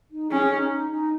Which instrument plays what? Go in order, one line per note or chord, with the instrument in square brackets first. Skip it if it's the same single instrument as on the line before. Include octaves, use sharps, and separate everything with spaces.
[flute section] D#4
[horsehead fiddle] C#4 [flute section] G#4
[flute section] D#4
D#4
D#4